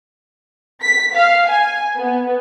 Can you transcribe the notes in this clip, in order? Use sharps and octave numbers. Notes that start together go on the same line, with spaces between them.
B6
F5
G#5
B3